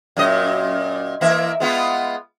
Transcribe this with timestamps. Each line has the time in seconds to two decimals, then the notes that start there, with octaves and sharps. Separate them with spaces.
0.17 F#2 A#2 D#5
1.21 E3 A#3 E5
1.60 G#3 B3 F4